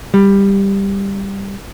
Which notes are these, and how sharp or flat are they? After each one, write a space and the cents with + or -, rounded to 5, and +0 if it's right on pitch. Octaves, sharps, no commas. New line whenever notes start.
G3 +10